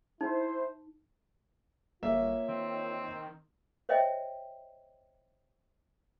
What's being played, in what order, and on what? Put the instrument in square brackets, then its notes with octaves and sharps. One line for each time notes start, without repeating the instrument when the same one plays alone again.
[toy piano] D#4 [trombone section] E4 C5
[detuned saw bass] G1 [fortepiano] A#3 E5 [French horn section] F4 C#5
[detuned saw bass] D#3 [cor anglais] C4
[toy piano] C5 C#5 D#5 E5 G5